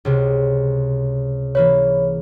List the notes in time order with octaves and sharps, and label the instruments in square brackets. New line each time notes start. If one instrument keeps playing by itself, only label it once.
[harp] C#2 C3 G#3
[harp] E3 A#3 B4 [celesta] C#5